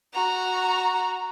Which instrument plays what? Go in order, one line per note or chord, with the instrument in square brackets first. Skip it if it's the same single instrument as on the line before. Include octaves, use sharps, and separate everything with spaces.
[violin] F#4 A#5